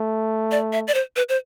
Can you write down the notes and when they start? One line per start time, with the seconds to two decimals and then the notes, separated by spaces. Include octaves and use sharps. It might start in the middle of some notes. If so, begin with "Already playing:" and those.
Already playing: A3
0.51 D5
0.73 E5
0.87 D5
0.94 C5
1.16 B4
1.29 C5